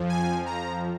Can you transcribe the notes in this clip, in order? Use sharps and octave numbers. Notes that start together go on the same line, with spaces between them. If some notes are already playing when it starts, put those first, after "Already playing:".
Already playing: F2 F3
G#5
A#5